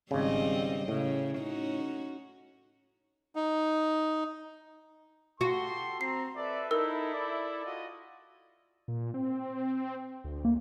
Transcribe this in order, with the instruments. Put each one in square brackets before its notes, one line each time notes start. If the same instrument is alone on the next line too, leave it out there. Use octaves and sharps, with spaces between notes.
[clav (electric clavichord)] G#1 C#3 [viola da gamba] G3 C4 D#5
[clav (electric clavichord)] A2 [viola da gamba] C#3
[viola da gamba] C#4 D#4 F#4
[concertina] D#4
[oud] F#4 [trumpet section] G4 A4 C6
[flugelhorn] C4 [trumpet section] A#5 [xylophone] C7
[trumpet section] A4 B4 E5 [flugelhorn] D5
[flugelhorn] D#4 [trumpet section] E4 A4 [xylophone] A#4 E6
[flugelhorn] D5
[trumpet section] F4 F#4 D#5
[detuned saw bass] A#2
C4
D2
[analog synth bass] A#3